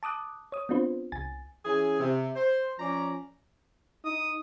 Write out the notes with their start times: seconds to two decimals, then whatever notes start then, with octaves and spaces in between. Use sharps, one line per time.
0.03 A5 D6 D#6 F#6
0.52 C#5 D#6
0.69 B3 C4 D4 F4 B4 C5
1.12 C2 G#5 A6
1.65 E3 C#4 G#4
1.99 C3
2.36 C5
2.78 F3 C#4 D5 A#5
4.05 D#4 D#6